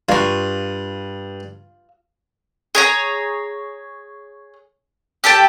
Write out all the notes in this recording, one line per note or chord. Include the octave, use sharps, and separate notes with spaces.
G2 F4 C#6
G#4 C#5 A#5
G4 A4 G5 A5